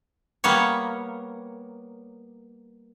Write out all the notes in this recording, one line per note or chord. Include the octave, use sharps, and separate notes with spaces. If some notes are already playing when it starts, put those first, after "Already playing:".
G3 A#3 B3 C#5